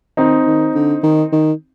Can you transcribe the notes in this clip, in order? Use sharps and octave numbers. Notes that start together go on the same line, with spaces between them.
D#3 C4 D#4
D#3
D3
D#3
D#3